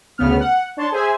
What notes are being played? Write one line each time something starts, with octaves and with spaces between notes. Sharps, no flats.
D2 C#3 B3 F6
F#5
D4 C#5 A5 C6
G#4 C5 E5 G#5